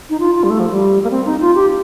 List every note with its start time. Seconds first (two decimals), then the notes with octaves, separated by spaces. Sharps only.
0.10 D#4
0.20 F4
0.35 F4
0.44 G3
0.50 A3
0.60 F3
0.71 G3
1.04 A#3
1.11 C4
1.26 D#4
1.41 F4
1.55 G4